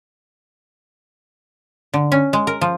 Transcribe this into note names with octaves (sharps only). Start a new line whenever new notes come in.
D3
C#4
G#3
A#4
F3